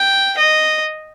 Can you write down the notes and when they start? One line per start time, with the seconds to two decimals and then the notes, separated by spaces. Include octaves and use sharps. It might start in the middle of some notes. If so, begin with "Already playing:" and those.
Already playing: G5
0.38 D#5